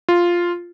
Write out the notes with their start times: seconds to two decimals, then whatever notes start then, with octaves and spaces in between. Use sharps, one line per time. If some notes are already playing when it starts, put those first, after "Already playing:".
0.09 F4